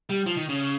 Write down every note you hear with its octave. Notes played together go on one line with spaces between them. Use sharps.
G3
F3
D#3
C#3